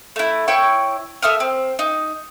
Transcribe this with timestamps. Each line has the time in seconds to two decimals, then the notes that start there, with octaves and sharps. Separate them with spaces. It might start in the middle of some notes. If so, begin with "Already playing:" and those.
0.16 A3 E4
0.48 E4 C#5 G5 C#6
1.22 A4 E5 D#6 F6
1.40 C4
1.79 D#4